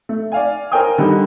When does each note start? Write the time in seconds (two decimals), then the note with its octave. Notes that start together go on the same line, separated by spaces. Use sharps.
0.09 A3
0.32 D5 F5 G#5
0.72 A#4 C5 C#5 G5 G#5 D#6
0.98 D3 D#3 G3 D#4